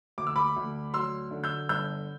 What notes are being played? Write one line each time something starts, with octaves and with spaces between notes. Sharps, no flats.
D2 D6
E6
B5 D6
D2
F#3 C6 E6
D3
E6 G6
G1 E6 G6